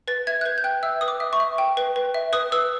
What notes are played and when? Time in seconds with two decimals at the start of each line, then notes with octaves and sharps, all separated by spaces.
0.08 B4 A6
0.27 E5 G#6
0.41 F#6
0.45 B4 G6
0.58 G6
0.64 G5 F#6
0.83 E5 E6
1.01 B4 D#6
1.08 D6
1.20 E5
1.33 C#6
1.40 E5
1.58 G5
1.77 B4
1.96 B4
2.14 E5
2.33 B4 D#6
2.52 B4 E6